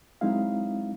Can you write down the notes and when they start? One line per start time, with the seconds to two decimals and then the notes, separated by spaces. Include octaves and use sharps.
0.21 F#3 G#3 C4 D#4 E4 F5